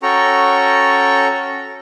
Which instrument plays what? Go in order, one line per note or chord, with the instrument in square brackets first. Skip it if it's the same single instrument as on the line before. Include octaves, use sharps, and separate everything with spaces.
[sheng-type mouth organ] C#4 F#4 A4 G5 A#5 C#6